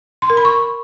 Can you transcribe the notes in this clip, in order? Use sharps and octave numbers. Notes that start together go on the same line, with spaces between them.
C6
A#4
B5
C#6